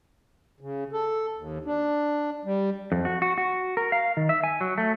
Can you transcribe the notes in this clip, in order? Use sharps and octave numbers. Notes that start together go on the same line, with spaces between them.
C#3
A4
D#2
D4
G3
F2
F#4
F#4
F#4
A#4
F5
D#3
E5
G#5
F#3
A3